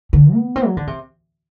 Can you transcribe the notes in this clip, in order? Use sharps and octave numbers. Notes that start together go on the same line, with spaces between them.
D3
B3
C4
F#3
D3
C3